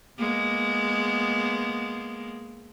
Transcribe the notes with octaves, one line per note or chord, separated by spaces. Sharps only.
G#3 A#3 B3